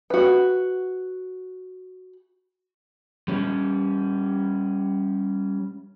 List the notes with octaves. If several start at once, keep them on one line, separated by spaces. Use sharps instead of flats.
F#4 B4
G3 C#4